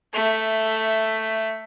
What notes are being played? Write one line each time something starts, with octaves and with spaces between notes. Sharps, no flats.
A3 E5